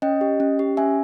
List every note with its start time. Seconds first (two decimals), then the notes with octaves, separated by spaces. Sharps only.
0.02 C#4 D#5 G5
0.21 G4
0.40 C#4
0.59 G4
0.77 C#4 E5 G#5